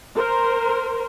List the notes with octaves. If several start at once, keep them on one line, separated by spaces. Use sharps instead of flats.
A#4 C5